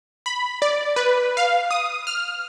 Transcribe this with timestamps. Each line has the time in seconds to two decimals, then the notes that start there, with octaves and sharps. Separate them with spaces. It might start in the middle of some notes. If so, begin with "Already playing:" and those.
0.26 B5
0.62 D5
0.96 B4
1.37 F5
1.71 D#6
2.07 F6